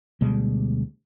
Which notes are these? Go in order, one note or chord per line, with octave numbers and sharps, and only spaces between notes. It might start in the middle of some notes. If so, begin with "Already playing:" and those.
D2 B2 G3 G#3